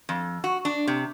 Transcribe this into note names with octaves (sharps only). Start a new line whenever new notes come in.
F2
F#4
D4
C3